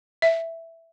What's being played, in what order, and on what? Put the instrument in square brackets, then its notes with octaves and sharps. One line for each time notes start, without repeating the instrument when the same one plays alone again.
[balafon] E5